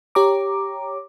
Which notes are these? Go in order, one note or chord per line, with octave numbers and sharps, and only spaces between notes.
G4 C#5 A#5 D6